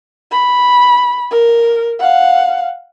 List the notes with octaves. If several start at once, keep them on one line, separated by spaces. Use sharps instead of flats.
B5
A#4
F5 F#5